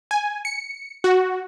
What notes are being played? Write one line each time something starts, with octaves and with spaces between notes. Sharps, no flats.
G#5
C#7
F#4